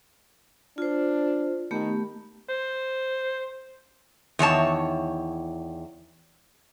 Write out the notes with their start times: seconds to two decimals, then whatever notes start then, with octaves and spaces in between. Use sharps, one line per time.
0.78 D4 F4 C5
1.71 D#3 A3 B3 G4
2.49 C5
4.39 E2 D#3 C#5 A5